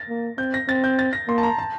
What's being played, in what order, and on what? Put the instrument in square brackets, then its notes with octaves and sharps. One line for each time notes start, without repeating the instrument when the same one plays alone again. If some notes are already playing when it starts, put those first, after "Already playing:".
Already playing: [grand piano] A6 A#6
[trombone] A#3
[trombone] C4 [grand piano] G6
[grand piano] A#6
[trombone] C4 [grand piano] A6
[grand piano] G6
A6
A#6
[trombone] A#3 [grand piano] C6
[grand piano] A5
A#5
A5